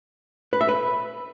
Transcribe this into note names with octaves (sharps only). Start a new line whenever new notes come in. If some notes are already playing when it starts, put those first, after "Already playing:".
B4
E5
B4